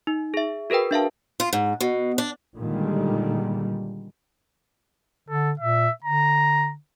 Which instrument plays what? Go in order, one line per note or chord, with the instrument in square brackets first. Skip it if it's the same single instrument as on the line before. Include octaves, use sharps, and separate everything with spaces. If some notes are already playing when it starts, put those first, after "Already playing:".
[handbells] D#4
G#4 E5
F#4 G#4 A#4 B4 G5
D4 E5 F5 A5
[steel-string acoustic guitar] F4
G#2
B2
D4
[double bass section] A#2 D3 D#3 G3 G#3
[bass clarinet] D3 [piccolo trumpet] A4
[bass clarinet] A#2 [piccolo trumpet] E5
[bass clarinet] D3 [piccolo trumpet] A#5